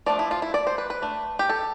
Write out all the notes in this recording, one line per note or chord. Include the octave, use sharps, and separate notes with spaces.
F3 A3 D4 D5
E4
F4
E4
D5
C5
B4
B4
A3 D4
G4
A4